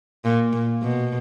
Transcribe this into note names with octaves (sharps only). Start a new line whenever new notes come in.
A#2
A#2
B2